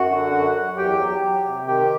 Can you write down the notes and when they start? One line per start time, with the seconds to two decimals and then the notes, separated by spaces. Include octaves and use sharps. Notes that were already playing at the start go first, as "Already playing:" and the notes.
Already playing: F#2 F#4 F#5
0.10 D3
0.32 F#2
0.55 F#2
0.77 E2 G4 G5
1.00 F#3
1.22 F#3
1.44 C3
1.66 D#3 G4 G5